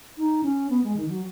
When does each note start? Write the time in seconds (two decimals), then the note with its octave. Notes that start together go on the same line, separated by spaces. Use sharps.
0.17 D#4
0.43 C#4
0.70 B3
0.84 G#3
0.97 D#3
1.09 F#3